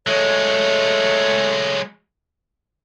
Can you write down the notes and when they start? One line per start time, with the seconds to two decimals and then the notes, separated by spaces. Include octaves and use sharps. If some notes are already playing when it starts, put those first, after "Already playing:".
0.07 F#3 G#3 A3 C#5